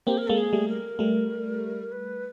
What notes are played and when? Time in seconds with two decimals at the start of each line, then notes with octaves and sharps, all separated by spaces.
0.07 A#3 C4 G4
0.18 A#4
0.28 G#3 A#3 A4
0.38 G#4
0.53 G3 A3
0.68 A#4
0.99 G3 A3
1.92 B4